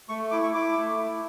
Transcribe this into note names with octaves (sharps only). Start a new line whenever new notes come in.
A3 C#6
E4 D6
C#6
E4 D6
A3
E4